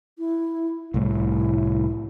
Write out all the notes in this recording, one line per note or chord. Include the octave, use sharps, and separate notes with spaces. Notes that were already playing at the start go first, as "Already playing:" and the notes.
E4
C2 A2 E4